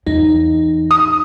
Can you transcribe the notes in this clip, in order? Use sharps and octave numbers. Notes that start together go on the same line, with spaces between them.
E2 D#4
D#6